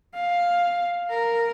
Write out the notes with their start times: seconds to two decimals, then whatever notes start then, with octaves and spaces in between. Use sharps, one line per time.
0.14 F5
1.10 A#4